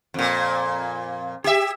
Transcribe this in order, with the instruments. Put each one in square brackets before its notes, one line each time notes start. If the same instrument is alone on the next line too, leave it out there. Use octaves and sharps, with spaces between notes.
[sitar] F2 A#2
G4 E5